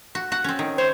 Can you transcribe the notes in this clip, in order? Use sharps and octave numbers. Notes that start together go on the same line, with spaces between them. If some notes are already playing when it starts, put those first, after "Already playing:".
F#4
F#4 F#5
C4 C#4
D#3
C5 C#5